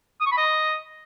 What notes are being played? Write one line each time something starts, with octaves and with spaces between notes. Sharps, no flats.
D#6
C#6
B5
D#5